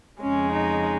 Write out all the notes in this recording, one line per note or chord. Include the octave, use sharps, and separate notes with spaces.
F2 C#3 G#3 C#4
D#4